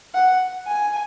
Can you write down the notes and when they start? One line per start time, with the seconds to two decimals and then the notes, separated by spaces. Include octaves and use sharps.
0.15 F#5
0.67 G#5